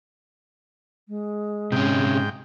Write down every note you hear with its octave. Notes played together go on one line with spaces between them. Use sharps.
G#3
G#2 C3 C#4 G5